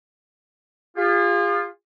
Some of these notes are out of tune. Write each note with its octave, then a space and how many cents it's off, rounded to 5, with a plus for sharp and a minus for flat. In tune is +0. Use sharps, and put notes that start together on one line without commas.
F4 +5 G#4 -40